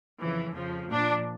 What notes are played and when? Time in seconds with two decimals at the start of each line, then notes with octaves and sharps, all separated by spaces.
0.20 F2 C#3 E3
0.55 F2 C#3 F3
0.90 A#2 F3 D4